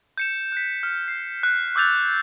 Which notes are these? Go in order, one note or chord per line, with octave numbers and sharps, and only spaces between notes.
G6 C#7 E7
F#6 B6
F6
C7
F#6
C#6 D6 E6 G6 A6 F7